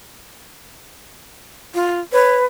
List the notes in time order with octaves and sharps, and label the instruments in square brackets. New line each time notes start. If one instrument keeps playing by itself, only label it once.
[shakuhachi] F4
[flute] B4 [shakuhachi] C#5